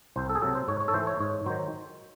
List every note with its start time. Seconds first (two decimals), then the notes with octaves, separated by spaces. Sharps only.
0.16 C2 C5
0.29 A4
0.35 G#4
0.42 C3 F#3 A4
0.55 C5
0.68 G#2 C#5
0.80 C#5
0.88 A4
0.93 E3 A3 C5
1.07 C#5
1.20 G#2 C#5
1.46 D#3 F#3 C5